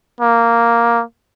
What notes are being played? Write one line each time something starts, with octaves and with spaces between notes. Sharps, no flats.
A#3